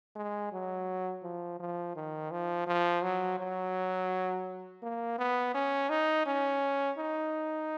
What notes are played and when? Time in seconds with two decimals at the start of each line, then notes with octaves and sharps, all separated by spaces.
0.16 G#3
0.53 F#3
1.23 F3
1.60 F3
1.96 D#3
2.32 F3
2.67 F3
3.03 F#3
3.39 F#3
4.83 A#3
5.19 B3
5.54 C#4
5.90 D#4
6.27 C#4
6.98 D#4